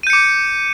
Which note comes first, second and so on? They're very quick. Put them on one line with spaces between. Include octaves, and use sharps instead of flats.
D#7 G6 C#7 D6